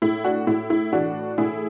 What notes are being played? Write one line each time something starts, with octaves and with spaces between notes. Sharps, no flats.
A2 E4
D4 F#4
A2 E4
E4
E3 D4 F#4
A2 E4 G#4